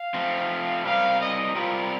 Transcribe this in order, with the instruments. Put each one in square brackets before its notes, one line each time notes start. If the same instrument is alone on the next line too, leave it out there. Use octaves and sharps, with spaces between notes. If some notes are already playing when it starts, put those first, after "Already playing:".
Already playing: [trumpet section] F5
[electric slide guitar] F3 A3 C4
[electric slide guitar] C3 G3 C4 G4 A#4 [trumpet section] F5
[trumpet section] D#5
[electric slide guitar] C3 G3 C4 G4 A#4 [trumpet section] F4